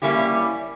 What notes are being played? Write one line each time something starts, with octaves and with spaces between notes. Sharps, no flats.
G3 A#3 C#4 E4 G4